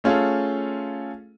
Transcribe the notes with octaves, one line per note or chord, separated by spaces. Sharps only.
A3 C#4 F4 G#4 A4